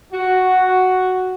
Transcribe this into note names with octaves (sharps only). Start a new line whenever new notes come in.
F#4